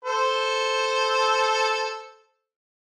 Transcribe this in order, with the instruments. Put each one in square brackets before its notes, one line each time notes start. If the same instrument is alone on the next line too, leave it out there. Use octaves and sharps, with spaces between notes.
[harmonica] A4 C5